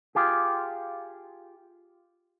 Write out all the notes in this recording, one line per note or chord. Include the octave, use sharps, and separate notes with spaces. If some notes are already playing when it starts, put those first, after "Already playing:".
F4 G4 G#4